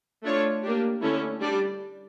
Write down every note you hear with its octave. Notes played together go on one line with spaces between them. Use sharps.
A3 D4 F4 C#5
A#3 D4 G4
D3 A3 C#4 E4
G3 D4 G4 D5